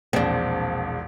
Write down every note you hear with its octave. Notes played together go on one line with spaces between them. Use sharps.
E1 A#1 C4 D4